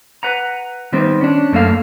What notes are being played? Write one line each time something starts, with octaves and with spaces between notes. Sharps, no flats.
B4 F#5 A#5
D#3 G3 B3 C4
C#4 D4
F#2 A3 A#3 A4 F5